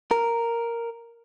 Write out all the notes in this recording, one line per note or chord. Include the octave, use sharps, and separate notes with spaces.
A#4